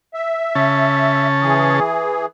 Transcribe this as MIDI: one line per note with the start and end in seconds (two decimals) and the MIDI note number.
0.14 1.27 76
0.55 1.80 49
0.55 1.80 61
0.55 1.80 81
1.41 2.26 52
1.41 2.26 68